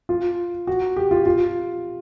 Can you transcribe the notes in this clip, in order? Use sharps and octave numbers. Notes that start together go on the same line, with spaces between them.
F4
F#4
G4
F4
F4